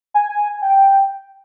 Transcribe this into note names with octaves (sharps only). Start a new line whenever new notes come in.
G#5
G5